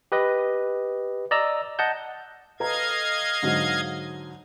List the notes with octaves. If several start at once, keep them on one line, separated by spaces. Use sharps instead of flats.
G4 B4 D#5
D5 D#5 A#5 E6
D#5 F#5 A5 G6
A4 B4 D#5 F5 A#5 G#6
G#2 D3 F#3